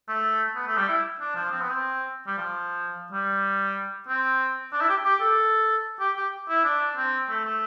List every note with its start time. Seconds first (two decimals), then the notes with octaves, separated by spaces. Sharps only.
0.08 A3
0.55 B3
0.67 A3
0.77 G3
0.89 E4
1.20 D4
1.35 F3
1.51 C4
1.61 B3
1.70 C4
2.27 G3
2.38 F3
3.12 G3
4.08 C4
4.73 D4
4.81 E4
4.89 G4
5.05 G4
5.21 A4
6.00 G4
6.17 G4
6.49 E4
6.64 D4
6.97 C4
7.29 A3
7.45 A3